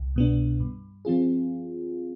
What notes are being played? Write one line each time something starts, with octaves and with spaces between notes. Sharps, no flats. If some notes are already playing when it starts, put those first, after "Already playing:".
Already playing: C2
B2 B3 D4
G2
F3 C4 F4 G#4